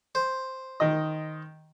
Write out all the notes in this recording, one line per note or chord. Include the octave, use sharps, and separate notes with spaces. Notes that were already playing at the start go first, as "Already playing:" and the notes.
C5
D#3 D#5